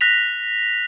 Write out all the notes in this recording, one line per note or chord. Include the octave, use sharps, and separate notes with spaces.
F#6 A#6 B6 F7